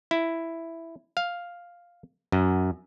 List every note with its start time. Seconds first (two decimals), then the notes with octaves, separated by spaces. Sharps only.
0.11 E4
1.17 F5
2.32 F#2